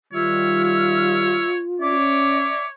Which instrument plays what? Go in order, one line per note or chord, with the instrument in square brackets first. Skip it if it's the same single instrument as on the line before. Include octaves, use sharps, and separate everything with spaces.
[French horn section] D#3 G3 [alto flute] F4 [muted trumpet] C#5 [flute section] E5 E6 F6
[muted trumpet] C#5
[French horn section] C#4 [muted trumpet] C#5 [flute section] D5 E5 D6